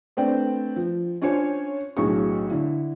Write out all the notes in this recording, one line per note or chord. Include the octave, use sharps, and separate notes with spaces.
A3 C4 D4 B4 D5 G5
F3
C#4 D4 F4 C5 C#5 G#5
B1 A2 D4 F#4 G#4 C#6
D3 E4